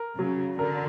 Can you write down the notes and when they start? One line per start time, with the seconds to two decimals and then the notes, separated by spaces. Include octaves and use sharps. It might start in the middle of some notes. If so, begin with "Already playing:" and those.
Already playing: A#4
0.18 C#3 F#3
0.59 D3 A#4